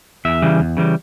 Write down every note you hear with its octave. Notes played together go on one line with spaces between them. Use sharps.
E2 E5
C#3 E3 G3
E2
C#3 E3 G3